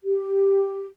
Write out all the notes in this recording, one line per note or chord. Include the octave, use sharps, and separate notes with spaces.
G4